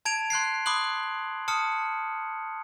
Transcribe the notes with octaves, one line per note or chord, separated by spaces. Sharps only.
A5 G#6 D7 F7
C6 F#6 G#6 C7
B5 C6 D6 D#6 F#6 F#7
A5 D#6 F6 C#7